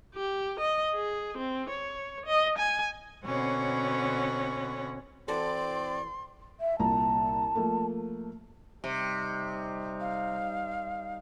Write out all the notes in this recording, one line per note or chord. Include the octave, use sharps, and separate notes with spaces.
G4
D#5
G#4
C4
C#5
D#5
G#5
B2 D3 C4 C#4 C#5 F#5
E3 C4 F#4 A4 D5 C6
E5
C2 A#2 A5 A#5
F3 A3 A#3
C3 G3 D#4
F5